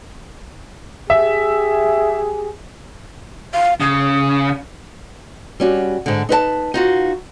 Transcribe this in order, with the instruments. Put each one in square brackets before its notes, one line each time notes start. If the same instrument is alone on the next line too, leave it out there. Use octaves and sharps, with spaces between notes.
[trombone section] G4 G#4 [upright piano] E5
[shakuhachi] F5
[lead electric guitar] C#3 [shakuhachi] D#6
[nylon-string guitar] G3 C#4 F#4
G#2 D3
D#4 B4 C5 A5
D#4 F4 F#4